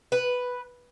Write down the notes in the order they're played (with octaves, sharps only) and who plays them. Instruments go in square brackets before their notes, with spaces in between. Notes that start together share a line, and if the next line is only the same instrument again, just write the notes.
[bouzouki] B4